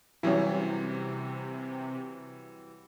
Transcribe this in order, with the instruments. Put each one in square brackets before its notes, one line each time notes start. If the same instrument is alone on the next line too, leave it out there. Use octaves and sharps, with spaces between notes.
[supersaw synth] C3 [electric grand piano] E3 F#3 G3 [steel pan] C#4 E4